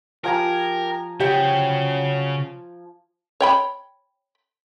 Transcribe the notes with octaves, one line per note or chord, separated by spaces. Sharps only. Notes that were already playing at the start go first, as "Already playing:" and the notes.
F3 G4 A#4 G#5 A#5
C#3 F#3 G4 C5 G5
C#5 G5 B5